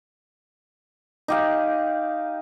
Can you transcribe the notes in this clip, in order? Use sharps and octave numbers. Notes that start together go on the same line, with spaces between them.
D#4 G4 F5